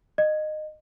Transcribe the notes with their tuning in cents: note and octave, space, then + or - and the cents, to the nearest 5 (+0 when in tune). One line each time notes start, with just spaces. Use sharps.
D#5 -20